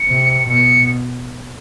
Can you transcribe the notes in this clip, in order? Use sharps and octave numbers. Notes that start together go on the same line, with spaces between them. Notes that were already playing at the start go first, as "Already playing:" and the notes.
Already playing: C#7
C3
B2 C#7